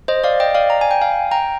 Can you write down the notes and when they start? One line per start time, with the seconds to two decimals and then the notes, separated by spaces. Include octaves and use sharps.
0.08 C5 D#5
0.24 D5 F5
0.40 D#5 G5
0.55 D5 F5
0.70 A#5
0.81 G#5
0.91 G5
1.01 F5 G#5
1.31 G5 A#5